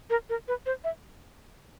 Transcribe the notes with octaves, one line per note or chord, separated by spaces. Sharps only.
A#4
A#4
B4
C5
E5